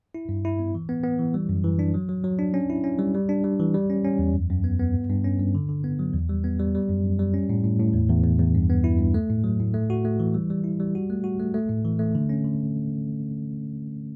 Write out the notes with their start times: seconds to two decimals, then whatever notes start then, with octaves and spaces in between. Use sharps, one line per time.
0.15 E4
0.29 G2
0.45 E4
0.59 B3
0.75 E3
0.89 B3
1.04 B3
1.19 E3
1.34 G3
1.49 F#2
1.64 E3
1.79 D4
1.94 F#3
2.09 F#3
2.24 F#3
2.39 D4
2.54 C#4
2.70 E4
2.84 C#4
2.99 G3
3.15 G3
3.29 D4
3.44 G3
3.60 E3
3.74 G3
3.90 C#4
4.05 C#4
4.19 E2
4.34 F#2
4.50 F#2
4.64 B3
4.80 B3
4.94 G2
5.10 G2
5.24 C#4
5.39 G2
5.55 D3
5.69 D3
5.84 B3
5.99 F#3
6.14 E2
6.29 G3
6.44 B3
6.59 G3
6.75 G3
6.89 F#2
7.04 F#2
7.19 G3
7.34 C#4
7.50 A2
7.64 A2
7.80 A2
7.94 E2
8.09 E2
8.24 E2
8.39 E2
8.55 G2
8.70 B3
8.84 E4
8.99 G2
9.14 A3
9.30 A2
9.44 F#3
9.60 A2
9.74 A3
9.90 F#4
10.05 A3
10.20 E3
10.34 G3
10.50 G3
10.64 E4
10.80 G3
10.95 F#4
11.10 A3
11.24 F#4
11.40 A3
11.54 A3
11.70 A2
11.85 E3
11.99 A3
12.15 D3
12.29 C#4
12.44 D3